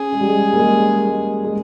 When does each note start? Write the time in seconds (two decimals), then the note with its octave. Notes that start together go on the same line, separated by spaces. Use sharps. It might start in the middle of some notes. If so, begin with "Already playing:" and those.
Already playing: C#4 G#4
0.12 G#3
0.21 G3
0.28 G#3
0.53 A#3
0.59 G#3
1.07 G#3
1.45 G#3